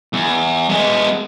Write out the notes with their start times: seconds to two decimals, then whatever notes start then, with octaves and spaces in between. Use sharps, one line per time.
0.13 E2
0.69 G#3 B3